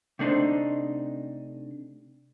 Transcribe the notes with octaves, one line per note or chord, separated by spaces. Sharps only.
C3 A3 D4 D#4 C5